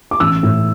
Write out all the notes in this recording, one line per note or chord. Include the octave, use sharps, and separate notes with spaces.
D6
A1 E6
A2